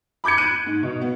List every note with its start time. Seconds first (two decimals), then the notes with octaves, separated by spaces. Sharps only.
0.24 B5 D6 G6 G#6 C#7
0.38 F#6 D7 D#7
0.66 G#2
0.83 B2
1.01 B3